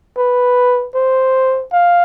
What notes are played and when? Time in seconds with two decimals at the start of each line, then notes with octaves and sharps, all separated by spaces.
0.17 B4
0.95 C5
1.72 F5